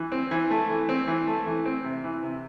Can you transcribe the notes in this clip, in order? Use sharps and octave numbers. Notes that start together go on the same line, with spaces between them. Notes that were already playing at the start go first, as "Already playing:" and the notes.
Already playing: E3
C4
E3
A3
E3
C4
E3
A3
E3
C4
C3
E3
C3